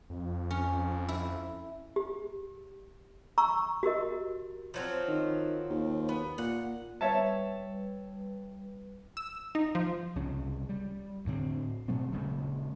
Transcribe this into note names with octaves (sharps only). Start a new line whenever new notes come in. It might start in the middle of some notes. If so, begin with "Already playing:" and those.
F2
C#4
E4
G4
A#5 C#6 E6
F#4 G4 A#4 D#5
F3 F#3 C4
D#3
D#2
B3
A#2 F#5
G3 B4 C#5 E5 A5
E6
D#4
F3
C2 C#3 C#4
G3
D2 A2 D3 C4
B2 F#3 A3 C4
D#1 C#3 G#3